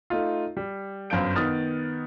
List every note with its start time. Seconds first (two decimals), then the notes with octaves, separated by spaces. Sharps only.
0.10 A3 D#4 F4
0.57 G3
1.10 G1 F#2 C5 F5 G6 D7
1.36 D#3 B3 D#6 F6 A6